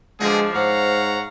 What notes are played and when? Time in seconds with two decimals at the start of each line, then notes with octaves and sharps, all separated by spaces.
0.20 B2 D3 F3 G#3 D4 G#4
0.55 G#2 C5 C#5 F5 F#5 A#5